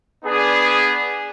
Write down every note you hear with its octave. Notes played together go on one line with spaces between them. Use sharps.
B3 D4 G#4